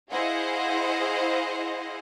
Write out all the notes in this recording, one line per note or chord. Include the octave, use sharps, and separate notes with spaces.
E4 G#4 C5 D#5 F5 F#5